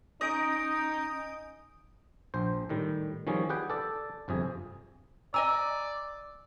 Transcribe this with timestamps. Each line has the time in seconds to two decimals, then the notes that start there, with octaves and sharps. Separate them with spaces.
0.21 C#4 D#4 D#5 G#5 A#5 D#6 G6 D7
2.34 A#1 C5
2.69 A2 D#3 G3
3.27 D#3 F3 G3 C#4 G#4
3.49 G4 G#4 B4 F#5 G5
3.70 A4 D5
4.28 G1 F2 C3 G#4
5.34 D5 D#5 G#5 A#5 E6